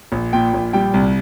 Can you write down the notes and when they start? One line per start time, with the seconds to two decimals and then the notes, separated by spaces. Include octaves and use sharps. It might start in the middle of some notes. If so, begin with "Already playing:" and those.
0.12 A#1
0.33 A#2 G5
0.54 A#1
0.73 G3 G5
0.94 C2